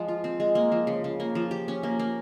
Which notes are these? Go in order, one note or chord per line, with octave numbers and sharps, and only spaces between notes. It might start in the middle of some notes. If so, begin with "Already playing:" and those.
Already playing: F3 G#3
F4
C4
G#3
A#3
F3
C#3
C#3
A#3
F3
G4
C#4
A#3
A#3